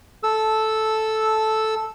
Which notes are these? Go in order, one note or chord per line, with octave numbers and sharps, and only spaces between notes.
A4 E6